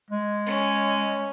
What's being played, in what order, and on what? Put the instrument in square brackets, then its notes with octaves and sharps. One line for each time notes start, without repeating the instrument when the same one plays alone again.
[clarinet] G#3
[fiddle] C#4